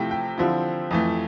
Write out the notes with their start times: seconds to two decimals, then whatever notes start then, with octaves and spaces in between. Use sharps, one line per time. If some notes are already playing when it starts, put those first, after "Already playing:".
Already playing: C3 F3 A3 E4 G5
0.11 G5
0.38 D3 F3 C4 E4
0.91 F2 E3 A3